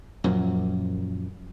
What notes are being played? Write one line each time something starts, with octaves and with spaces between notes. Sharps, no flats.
F#2 A#2 F3